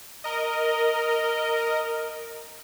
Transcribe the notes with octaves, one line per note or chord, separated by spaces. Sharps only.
A#4 D#5